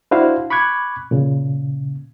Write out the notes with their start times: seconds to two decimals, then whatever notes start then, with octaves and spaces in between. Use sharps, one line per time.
0.11 D4 E4 F#4 C5 F5
0.50 B5 C#6 D6 F#6 G#6
1.11 A#2 C#3